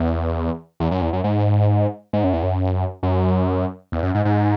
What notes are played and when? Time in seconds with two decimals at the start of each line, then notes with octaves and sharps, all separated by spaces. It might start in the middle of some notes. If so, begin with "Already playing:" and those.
Already playing: E2
0.80 E2
0.91 F#2
1.02 E2
1.13 F#2
1.24 G#2
2.13 G#2
2.24 F#2
2.33 E2
2.43 F#2
3.03 F#2
3.92 E2
4.03 F#2
4.15 G#2
4.25 G#2